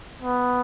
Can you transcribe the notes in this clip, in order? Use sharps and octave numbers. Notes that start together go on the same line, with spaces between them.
B3